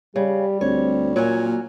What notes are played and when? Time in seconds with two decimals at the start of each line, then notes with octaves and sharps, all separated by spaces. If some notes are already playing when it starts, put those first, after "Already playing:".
0.16 C#3 G3 G4
0.61 D2 C4 C#5
1.16 A#2 F#3 A#3 C#4